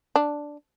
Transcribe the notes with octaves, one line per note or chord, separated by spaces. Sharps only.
D4